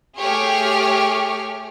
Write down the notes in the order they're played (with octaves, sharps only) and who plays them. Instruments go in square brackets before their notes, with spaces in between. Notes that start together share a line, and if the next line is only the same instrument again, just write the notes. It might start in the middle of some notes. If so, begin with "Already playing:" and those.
[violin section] A3 G4 G#4 C#5 F6